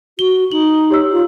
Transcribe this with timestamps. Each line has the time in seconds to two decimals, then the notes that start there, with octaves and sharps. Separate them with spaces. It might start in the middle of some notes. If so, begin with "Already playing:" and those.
0.19 F#4 G7
0.52 D#4 F#7
0.90 G4 C#5 E6
1.13 F4